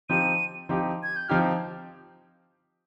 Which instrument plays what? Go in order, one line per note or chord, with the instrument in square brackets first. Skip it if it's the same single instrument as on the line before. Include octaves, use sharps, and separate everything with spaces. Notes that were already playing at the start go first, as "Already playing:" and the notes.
[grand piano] F3 C4 D#4 G4 [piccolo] D#7
[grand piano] F3 C4 D#4 G4
[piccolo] G#6
G6
[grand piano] F3 C4 D#4 G4 [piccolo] F6